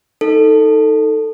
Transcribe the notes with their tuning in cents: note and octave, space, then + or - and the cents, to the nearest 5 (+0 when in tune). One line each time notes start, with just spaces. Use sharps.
D#4 +15 A4 +15